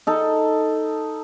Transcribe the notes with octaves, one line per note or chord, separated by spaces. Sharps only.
D#4 A4